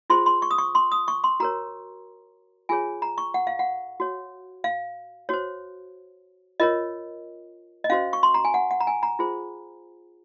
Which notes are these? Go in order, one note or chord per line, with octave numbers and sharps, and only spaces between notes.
F4 G#4 C5 C6
C6
C#6
D#6
C#6
C6
D#6
C#6
C6
F#4 A#4 C#5 A#5
F4 G#4 C#5 G#5
A#5
C#6
F#5
F5
F#5
F#4 C#5
F5
F#4 C5 C#5
F4 A#4 C#5 D#5
D#5
C#4 F#4 C5 F5
C#6
C6
A#5
G#5
F#5
F#5
A#5
G#5
A#5
F4 G#4 C5